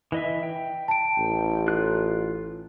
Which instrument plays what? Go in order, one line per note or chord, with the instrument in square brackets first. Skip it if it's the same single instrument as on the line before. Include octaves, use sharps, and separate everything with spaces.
[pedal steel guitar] E3 D#5 E5
G5
[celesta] A5 D7
[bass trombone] A1
[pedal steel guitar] F4 F#6